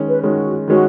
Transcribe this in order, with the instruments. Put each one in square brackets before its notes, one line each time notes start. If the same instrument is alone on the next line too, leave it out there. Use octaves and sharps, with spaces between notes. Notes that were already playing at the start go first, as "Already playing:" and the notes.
Already playing: [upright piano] D#3 G#3 C#4
[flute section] B4
[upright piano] D#3 G#3 C#4 [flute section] F#4
[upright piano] D#3 G#3 C#4 [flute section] F#4